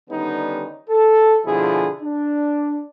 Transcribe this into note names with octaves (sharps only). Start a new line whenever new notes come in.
D3 D#3 G3 B3 C#4 D#4
A4
B2 D3 F3 E4 G#4
D4